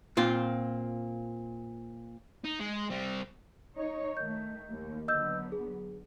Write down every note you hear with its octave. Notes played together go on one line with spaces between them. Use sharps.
A#2 C4 F4
D#4
G#3
G3 C4
D#4 C#5
D#3 A3 G6
D#2
D3 F#3 B3 D#5 E6 G6
G#4